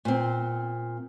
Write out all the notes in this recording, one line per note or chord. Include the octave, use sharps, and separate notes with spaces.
A#2 C4